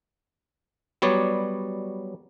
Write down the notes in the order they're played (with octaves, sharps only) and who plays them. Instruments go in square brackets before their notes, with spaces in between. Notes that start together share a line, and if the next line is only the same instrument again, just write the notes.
[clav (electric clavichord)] F#3 G3 B3 C#5 D5